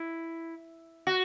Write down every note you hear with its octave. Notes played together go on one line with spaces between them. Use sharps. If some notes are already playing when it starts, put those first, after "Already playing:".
Already playing: E4
F#4